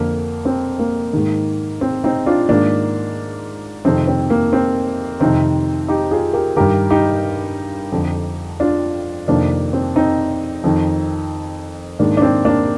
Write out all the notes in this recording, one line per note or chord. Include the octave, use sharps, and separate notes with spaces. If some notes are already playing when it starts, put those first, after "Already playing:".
Already playing: F2 D3 A#3
C4
A#3
G#2 D#3
C4
C4 D#4
D4 F4
G#2 D#3 A#3 D4
F2 C3 D#3 C4
C4
A#3
C4
F2 C3 D#3 C4 D#4
D#4 G4
F4 G#4
G4 A#4
G2 D#3 G4 A#4
D#4 G4
F2 D3
D4 F4
F2 C3 D#3 A#3 D4
C4
C4 D#4
F2 D#3
G#2 D#3 A#3 D4
D4
C4
A#3 D4